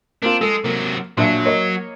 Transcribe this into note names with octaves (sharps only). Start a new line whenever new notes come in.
A#3 C4 D4 F4
G#3 A4
C3 F#3 A#3
A#1 F#3 D4 E5
A#3 C#5 D#5